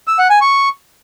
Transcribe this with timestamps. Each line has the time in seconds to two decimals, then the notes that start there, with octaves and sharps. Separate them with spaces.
0.08 E6
0.19 F#5
0.30 G#5
0.41 C#6